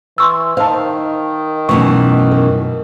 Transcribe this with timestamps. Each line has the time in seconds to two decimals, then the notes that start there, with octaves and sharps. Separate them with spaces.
0.18 E3 C6 C#6 E6
0.57 D#3 C5 F5 A5
1.69 F#2 B2 E3 A3 C#6
2.32 A#4